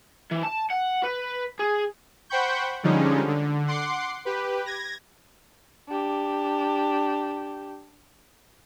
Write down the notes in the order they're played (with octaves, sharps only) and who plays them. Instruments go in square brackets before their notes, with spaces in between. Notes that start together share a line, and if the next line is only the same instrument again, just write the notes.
[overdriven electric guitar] E3
A5
F#5
B4
G#4
[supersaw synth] C5 F#5 G5 B5 C#6 G6
D3 F3 G3 G#3 C#4 D#4
D3
F#5 C6 D6 C7
G4 B4
G#6 A#6
[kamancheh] D4 G4